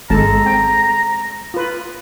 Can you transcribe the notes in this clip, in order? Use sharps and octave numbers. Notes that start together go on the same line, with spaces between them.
G#1 G#3 A4 A5 A#5
C4 G5
F4 B4